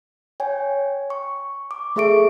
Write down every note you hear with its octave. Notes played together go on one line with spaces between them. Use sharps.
C#5 G5 G#5
C#6
D6
A3 G#4 A4 E5 C#6 D7